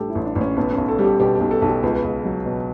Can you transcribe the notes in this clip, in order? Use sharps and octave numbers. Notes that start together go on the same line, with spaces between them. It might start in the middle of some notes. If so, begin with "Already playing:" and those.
Already playing: A1 A2 G3 D4 G4 A4
E4
A1
D4
A1
C#4
B1 B3
B1 C#4
A4
G3
G4
B2 G4
G4
B1
A4
B1
G4
C#2 B3
C#2
F#3
B2